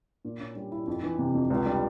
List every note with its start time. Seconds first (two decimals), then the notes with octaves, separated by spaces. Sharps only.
0.25 A#2
0.40 C#4
0.56 G3
0.72 E4
0.87 F2
1.03 E3
1.19 C3
1.35 F2
1.50 C#2
1.66 G3